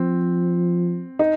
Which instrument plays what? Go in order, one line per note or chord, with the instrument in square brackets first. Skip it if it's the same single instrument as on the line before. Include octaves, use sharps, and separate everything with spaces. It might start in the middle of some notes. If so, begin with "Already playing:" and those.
Already playing: [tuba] F3 [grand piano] C4
[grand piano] D#4